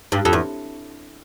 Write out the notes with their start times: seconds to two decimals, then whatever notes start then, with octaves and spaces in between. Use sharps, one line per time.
0.12 G2
0.25 F2
0.33 E2